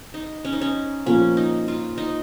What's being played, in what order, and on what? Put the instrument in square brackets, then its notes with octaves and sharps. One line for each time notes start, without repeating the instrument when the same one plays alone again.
[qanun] D#4
C#4
D#4
C#4
[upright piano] A#2 F3 A#3 [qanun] C#4
[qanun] D#4
F4
D#4